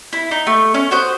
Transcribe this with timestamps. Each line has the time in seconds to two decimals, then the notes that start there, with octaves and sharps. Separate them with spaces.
0.13 E4
0.31 D#4
0.47 A3
0.74 C#4
0.91 F#4 C5 D#6